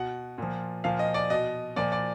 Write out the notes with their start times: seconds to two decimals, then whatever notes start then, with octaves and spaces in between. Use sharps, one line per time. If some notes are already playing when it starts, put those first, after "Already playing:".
Already playing: B2 F#5
0.38 A#2 F3
0.84 A#2 F3 F5
0.99 D#5
1.14 D5
1.30 B2 D#5
1.76 A#2 F3 D5
1.92 D5